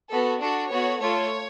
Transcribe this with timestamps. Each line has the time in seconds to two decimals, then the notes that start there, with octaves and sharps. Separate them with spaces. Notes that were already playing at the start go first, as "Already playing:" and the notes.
0.11 B3 F#4 A4
0.42 D4 F#4 A4
0.71 B3 F#4 A4 C#5
1.01 A3 F4 A4 C#5